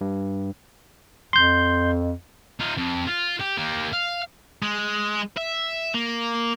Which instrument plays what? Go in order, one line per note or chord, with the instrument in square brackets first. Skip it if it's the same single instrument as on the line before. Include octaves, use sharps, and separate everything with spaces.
[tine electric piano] G2
[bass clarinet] F2 [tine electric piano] C6 G6
[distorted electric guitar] D#4 F4
F2
F4
G4
A#3 G4
F5
G#3
E5
A#3